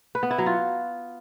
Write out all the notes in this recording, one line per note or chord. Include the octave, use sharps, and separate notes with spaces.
B4
B3
E4
F#3
F4